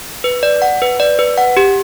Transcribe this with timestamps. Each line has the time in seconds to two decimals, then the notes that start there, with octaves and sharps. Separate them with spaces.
0.24 B4
0.43 D5
0.62 F#5
0.82 B4
1.00 D5
1.19 B4
1.38 F#5
1.57 G4